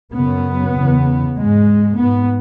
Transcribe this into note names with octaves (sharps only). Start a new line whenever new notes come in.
F#2 C#3 B3
E2 C#3
G#2 G#3
G#2 B3